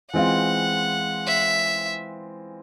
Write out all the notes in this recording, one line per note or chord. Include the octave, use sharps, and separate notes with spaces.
E3 G#3 C4 F4 F#5
E5